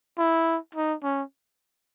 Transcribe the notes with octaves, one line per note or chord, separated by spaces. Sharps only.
E4
D#4
C#4